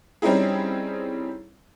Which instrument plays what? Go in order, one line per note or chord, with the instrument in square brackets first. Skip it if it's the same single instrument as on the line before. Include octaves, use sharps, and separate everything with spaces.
[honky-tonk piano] G3 C4 C#4 D#4 E4 G#4